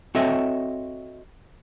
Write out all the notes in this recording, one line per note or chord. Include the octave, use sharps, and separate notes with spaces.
C4 F#4 A4 C#5 D#5 E5